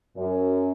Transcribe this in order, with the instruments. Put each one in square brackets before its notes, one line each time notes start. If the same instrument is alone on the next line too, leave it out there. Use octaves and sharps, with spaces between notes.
[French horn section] F#2